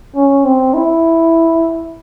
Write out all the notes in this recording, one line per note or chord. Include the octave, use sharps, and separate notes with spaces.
C#4
C4
E4